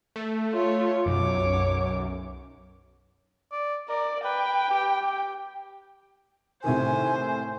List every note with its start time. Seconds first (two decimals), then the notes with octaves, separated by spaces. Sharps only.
0.16 A3
0.53 F4 C#5
1.06 B1 F#2 C#5 D6
3.52 D5
3.89 A#4 D5
4.25 B4 G5
4.71 G4
5.01 G4
6.64 A2 C3 D#3 C5 G#5